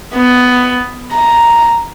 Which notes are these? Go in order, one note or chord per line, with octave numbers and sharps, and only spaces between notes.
B3
A#5